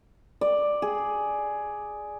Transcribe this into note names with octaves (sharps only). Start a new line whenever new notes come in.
D5
G#4